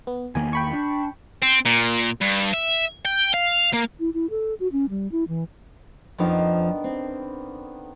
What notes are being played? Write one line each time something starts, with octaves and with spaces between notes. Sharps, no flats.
B3
E2 D#3 A#3 G#5
G5 B5 C#6
D4
C4
A#2
G2
E5
G5
F5
A#3
E4
E4
A4
F#4
C#4
G3
E4
E3
F2 D3 D#3 F3 B3 D#4
C4